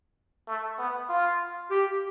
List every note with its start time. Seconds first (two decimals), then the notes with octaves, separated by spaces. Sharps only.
0.48 A3
0.79 B3
1.09 F4
1.70 G4